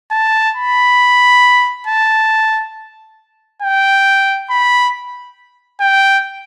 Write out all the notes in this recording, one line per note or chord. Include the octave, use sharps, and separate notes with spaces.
A5
B5
A5
G5
B5
G5